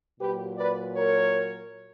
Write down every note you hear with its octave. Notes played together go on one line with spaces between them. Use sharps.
A#2 F#3 G4 B4
B4 D5
A#4 C#5